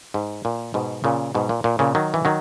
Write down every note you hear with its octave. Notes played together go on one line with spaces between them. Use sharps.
G#2
A#2
G#2 B2
A#2 C#3
G#2 B2
A#2
A#2
A#2 C#3
D#3 F#3
E3
D#3 F#3